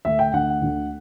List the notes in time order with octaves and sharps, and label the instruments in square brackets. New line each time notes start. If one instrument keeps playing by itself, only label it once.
[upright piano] D2 D3 A3 [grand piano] E5
[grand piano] G5
[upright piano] D2 D3 A3 [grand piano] F#5
[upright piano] D2 D3 A3